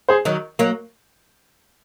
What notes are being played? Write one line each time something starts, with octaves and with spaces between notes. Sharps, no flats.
G#4 C5
D#3 F#3
F#3 A#3